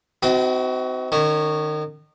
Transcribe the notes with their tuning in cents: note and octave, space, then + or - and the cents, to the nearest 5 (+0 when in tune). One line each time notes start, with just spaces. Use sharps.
C4 -30 D#4 +40 F#4 +20
D#3 -30 C#4 +0